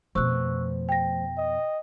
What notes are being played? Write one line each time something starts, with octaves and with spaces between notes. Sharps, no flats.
F2 B2 F3 A3 C5 C#6 E6 F#6
G5 A#6
D#5